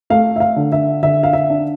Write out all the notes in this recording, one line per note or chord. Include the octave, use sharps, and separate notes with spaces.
A3 F5
E5
F5
D3
E5
D3 E5
F5
E5
D4